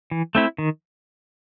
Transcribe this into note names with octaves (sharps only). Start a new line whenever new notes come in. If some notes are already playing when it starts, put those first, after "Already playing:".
E3
A3 C4 E4
D#3